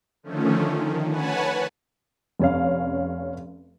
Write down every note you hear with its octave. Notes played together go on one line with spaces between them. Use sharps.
D3 D#3 F3 A3 C#4
D#3
B4 C#5 F#5 G#5 A5 B5
F1 C#4 F5